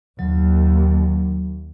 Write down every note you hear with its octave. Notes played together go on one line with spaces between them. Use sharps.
D#2 F#3